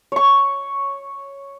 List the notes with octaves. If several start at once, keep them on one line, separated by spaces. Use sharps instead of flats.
C#5 C#6